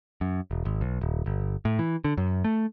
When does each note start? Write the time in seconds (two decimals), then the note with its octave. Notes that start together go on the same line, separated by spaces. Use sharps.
0.21 F#2
0.51 E1
0.65 G#1
0.81 B1
1.01 D#1
1.26 G1
1.65 A2
1.79 E3
2.04 D3
2.17 F#2
2.44 A3